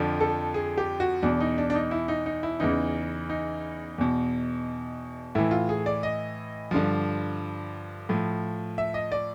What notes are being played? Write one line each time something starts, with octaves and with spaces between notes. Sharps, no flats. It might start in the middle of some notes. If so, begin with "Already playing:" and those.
Already playing: F2 D3 F3
A4
G#4
G4
F#4
E2 B2 D4
D#4
D4
D4
D#4
E4
D#4
D#4
E4
E2 C#3 E3 D#4
D#4
E2 B2
A2 E3 E4
F4
G#4
D5
D#5
G2 D3 F3
A2 F3
E5
D#5
D5